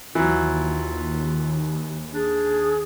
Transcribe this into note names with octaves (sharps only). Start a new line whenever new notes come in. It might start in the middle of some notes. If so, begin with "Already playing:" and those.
D#2 E3 F#3 F4
D4 G#4